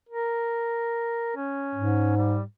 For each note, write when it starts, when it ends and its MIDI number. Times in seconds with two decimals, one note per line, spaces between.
0.09 1.32 70
1.36 2.17 61
1.75 2.43 44
2.17 2.42 55